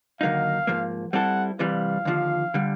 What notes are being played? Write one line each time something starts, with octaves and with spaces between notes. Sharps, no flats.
D#2 D3 F#3 A#3 D#4 F5
G#2 F3 A#3
G3 C4 E4 A4 F#5
C2 C3 E3 G3 F5
D#2 D3 F3
D3 G3